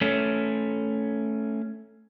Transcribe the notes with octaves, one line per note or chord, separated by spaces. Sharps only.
A3 C#4